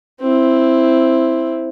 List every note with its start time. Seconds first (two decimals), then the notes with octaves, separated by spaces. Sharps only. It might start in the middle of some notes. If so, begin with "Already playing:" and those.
0.21 C4 E4